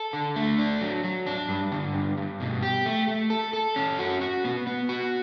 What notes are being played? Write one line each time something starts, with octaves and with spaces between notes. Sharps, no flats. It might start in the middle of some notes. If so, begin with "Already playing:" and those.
Already playing: A4
D3
A3
D4
F#3
F#3
D4
G2
D3
G2
G2
B2
G4
A3
A3
A4
A4
C#4
F#4
F#4
B3
B3
F#4